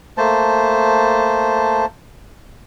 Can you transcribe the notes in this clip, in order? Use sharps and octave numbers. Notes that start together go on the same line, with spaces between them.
A3 A#3 C5 A5